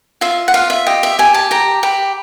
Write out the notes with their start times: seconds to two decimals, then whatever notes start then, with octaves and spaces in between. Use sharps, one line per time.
0.21 F4 E5
0.48 F#5
0.54 F4 F5
0.70 E5
0.86 G4 D#5
1.03 E5
1.19 G4 G#5
1.34 A5
1.51 G4 A#5
1.83 G4 B5